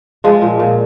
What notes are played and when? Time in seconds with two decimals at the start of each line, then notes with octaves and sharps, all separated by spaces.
0.24 F3 G#3
0.42 A#2
0.59 A#2